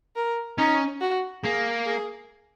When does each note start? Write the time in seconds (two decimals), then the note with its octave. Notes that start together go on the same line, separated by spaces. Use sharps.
0.16 A#4
0.58 C#4 D#4
1.01 F#4
1.44 A#3 G#4
1.86 G#4